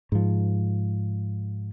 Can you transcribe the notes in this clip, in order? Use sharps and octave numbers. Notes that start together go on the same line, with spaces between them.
G#2 F3